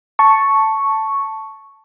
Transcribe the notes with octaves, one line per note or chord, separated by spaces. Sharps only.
A5 C#6